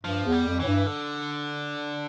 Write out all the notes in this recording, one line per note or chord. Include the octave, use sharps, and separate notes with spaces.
G2 F3
E2
G3
F2
A2 E3
G2
D3